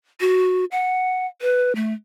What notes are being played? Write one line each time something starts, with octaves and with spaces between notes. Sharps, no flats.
F#4
F#5
B4
A3